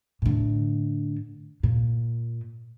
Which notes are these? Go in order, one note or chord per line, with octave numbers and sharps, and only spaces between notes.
A2 D3
A#2